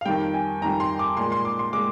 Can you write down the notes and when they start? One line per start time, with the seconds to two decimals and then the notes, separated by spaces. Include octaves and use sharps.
0.01 F5
0.05 F2 D#3 G3 G5
0.34 G#5
0.62 F2 D#3 G3 A#5
0.80 C6
0.99 D6
1.17 A#2 G#3 C6
1.32 C6
1.45 D6
1.59 C6
1.73 A#2 G#3 D6